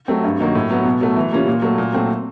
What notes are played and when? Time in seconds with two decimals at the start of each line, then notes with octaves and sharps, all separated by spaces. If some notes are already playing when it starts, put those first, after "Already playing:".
0.08 F#3 A3 C4
0.24 G2
0.40 D#3 F#3 A#3
0.55 A2
0.71 F#3 B3
0.85 B2
1.01 F#3 A3
1.17 E3
1.32 G3 A#3 C#4 F4
1.48 A#2
1.62 F#3 A3
1.78 A#2
1.93 F#3 A3 C4